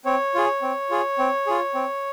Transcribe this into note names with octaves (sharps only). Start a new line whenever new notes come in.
C4 C#5
F4 G#4
C4
F4 G#4
C4
F4 G#4
C4